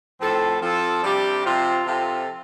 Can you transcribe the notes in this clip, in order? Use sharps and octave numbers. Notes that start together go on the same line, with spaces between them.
A2 F3 C4 A4
F3 C4 A4
C3 G3 D4 G4
C3 F3 C4 F4
C3 F3 C4 F4 A4